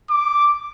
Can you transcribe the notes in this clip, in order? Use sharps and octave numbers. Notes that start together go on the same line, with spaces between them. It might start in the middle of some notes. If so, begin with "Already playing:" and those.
D6